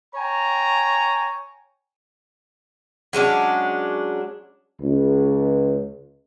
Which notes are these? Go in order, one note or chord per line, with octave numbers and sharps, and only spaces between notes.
C#5 G5 G#5 A#5
F#3 G#3 C#4 D4
C#2